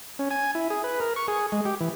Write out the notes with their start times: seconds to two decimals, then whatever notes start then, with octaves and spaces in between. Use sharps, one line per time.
0.19 C#4
0.31 G#5
0.55 E4
0.70 G#4
0.84 B4
1.00 A#4
1.16 C#6
1.28 G#4
1.52 G#3
1.65 G4
1.81 E3